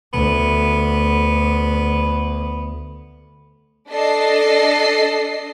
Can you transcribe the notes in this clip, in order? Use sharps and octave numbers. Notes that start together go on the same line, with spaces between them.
D2 B3
D4 A4 D#5 C7